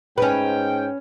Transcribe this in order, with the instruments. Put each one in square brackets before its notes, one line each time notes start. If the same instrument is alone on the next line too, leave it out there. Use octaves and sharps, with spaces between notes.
[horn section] G#2 G5 [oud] C#4 B4